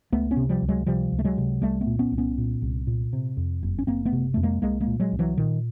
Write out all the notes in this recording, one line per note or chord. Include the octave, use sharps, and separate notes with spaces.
C#2 A3 B3
B3 C#4
C3
F3 G3
C#2
F#3 G#3
C3 F3 G3
C#2
A3
F#3 G#3
C3
C2 G3 A3
A3 B3
A#2
B3 C#4
C2
B3 C#4
A#2
C2
A#2
C3
F2
F#1
C#4
F#1 A#3 C4
A3 B3
C3
F2 A3
G#3 A#3
C2 G#3 A#3
G#3 A#3
A#2
F#3 G#3
C2
E3 F#3
A#2 D#3